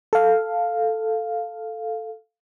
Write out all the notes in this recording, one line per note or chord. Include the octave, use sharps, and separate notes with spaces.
A4 F5